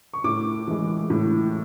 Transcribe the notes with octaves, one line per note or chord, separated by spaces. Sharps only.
C#6
A2 D6
E3 G#3
A2